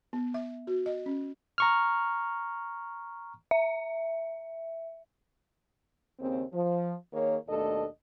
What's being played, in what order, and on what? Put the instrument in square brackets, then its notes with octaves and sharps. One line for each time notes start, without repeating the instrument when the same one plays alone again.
[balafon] B3
E5
F#4
D#5
C#4
[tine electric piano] A#5 C#6 F6
[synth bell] E5
[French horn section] D#2 C#3 C4
F3
D#3 A#3 G#4 C#5
D#2 B2 A3 D4 A4 D#5